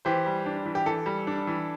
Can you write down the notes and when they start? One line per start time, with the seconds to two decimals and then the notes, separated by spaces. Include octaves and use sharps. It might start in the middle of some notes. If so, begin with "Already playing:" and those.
0.05 E3 G4 C5
0.26 G3
0.46 D4
0.66 E3
0.75 G4
0.86 E3 A4
1.06 G3
1.27 D4
1.47 E3